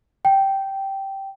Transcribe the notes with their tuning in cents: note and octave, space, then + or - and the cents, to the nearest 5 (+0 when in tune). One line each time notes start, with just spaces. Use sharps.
G5 -10